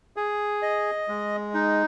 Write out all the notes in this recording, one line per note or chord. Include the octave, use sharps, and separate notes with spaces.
G#4
D#5
G#3
D#4